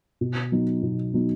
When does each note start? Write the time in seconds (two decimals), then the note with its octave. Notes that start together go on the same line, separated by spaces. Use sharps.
0.21 B2
0.52 F#3 B3 D#4
0.83 B2
1.14 F#3 B3 D#4